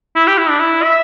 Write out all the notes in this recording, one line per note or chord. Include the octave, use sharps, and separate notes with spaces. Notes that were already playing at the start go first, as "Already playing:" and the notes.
E4
G4
E4
D4
E4
E5